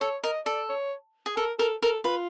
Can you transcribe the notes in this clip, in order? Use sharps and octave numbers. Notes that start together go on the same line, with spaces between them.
A4 C#5
A#4 D#5
A4 D5
C#5
G#4
A4 A#4
A4 A#4
A4 A#4
F4 B4